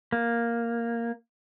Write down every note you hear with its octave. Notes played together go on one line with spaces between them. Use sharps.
A#3